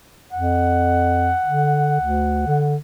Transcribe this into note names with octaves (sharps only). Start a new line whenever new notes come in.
F2 F#5
D3
D2
D3